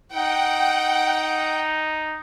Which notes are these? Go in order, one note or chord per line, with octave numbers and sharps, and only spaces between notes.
D#4 F#5 G5